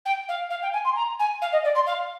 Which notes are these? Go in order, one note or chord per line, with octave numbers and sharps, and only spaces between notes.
G5
F5
F5
G5
G#5
C6
A#5
G#5
F5
D#5
D5
C6
F5